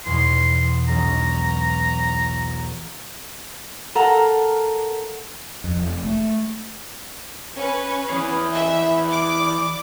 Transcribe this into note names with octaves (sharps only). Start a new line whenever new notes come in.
E2 B2 C6
E1 B1 A#5
A4 A#4 F5 F#5 A#5
F2
F1
A3
C#4 B4
E3 G#4
E5
D5 D6